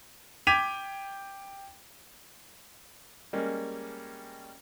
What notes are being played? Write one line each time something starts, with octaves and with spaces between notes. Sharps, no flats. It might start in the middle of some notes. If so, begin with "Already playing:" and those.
G5 D6 G#6 B6 D#7 F7
G3 G#3 A#3 C#4 A#4